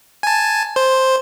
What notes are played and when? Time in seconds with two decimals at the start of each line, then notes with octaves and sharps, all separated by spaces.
0.23 G#5 A5
0.76 C5